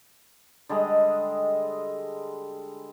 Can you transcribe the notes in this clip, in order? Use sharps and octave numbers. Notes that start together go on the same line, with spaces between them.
D3 G3 G#3 D#5